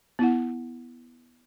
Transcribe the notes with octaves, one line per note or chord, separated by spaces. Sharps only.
B3 E4 F#5